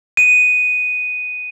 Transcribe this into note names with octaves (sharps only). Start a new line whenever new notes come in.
D#7